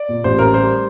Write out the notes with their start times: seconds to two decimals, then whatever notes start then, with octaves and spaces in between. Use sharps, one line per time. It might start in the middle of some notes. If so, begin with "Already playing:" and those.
Already playing: D5
0.09 A#2
0.24 A1 C5
0.38 A1 A#4
0.54 G3 C5